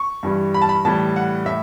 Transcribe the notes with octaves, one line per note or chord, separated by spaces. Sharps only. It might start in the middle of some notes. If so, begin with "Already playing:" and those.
Already playing: C#6
G2 E3 G3
B5
A5
B5
A2 E3 G3 A5
F#5
A2 E5